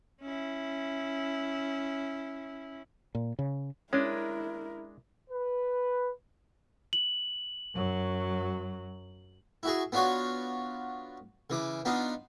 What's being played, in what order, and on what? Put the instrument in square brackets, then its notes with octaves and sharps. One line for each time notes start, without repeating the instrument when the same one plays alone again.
[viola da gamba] C#4 E4
[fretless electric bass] A#2
C#3
[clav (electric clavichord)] G#3 D4 [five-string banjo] C#4 [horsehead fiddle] E4 A#4
[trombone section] B4
[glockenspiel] F#7
[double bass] F#2 F#3
[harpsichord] E4 F#4 G#4
B3 D4 F4 F#4 C#5
C#3 E3 D6
B3 D4 D#4 F4